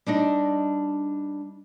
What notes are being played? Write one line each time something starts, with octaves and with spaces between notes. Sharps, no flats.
G3 D4 D#4 D#5